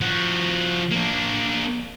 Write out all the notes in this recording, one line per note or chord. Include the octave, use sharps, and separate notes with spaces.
F3 F#4
A#3 D4